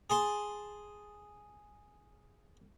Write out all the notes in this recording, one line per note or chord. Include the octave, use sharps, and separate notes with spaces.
G#4 A5 C6